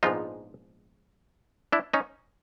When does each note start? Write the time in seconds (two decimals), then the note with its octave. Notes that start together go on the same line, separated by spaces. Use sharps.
0.03 A#1 G#2 F3 G#3 B3 D#4 F4
1.72 D4 E4
1.93 C#4 D#4